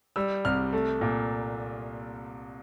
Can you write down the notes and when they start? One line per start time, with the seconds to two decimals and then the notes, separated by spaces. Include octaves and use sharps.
0.16 G3 E6
0.45 C2 F6
0.73 A3
1.01 A#2